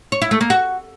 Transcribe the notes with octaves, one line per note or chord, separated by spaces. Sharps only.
C#5
E4
A3
A#3
F#4